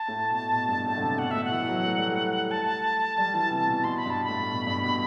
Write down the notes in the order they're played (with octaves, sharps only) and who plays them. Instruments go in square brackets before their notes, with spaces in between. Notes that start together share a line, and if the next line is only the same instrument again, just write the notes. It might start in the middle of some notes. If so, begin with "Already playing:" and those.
Already playing: [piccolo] A5
[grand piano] A2
B2
B2
G2
A2
D3
C3
[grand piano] B2 [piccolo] F#5
[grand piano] A2 [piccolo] E5
[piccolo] F#5
[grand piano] E3
F#3
A3
G3
A3
[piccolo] A5
[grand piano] G3
E3
C3
B2
[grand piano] B2 [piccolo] C6
[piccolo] B5
[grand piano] G2 [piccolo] A5
[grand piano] A2 [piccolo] B5
[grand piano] B2
G2
B2